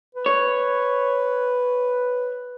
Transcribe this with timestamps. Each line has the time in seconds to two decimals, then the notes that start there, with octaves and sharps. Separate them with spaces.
0.15 B4
0.26 C#5